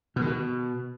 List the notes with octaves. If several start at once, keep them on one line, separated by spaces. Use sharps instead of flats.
B2
D#3
B2